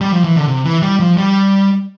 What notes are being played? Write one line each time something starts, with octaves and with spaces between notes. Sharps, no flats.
G3
F3
E3
D3
C3
E3
G3
F3
G3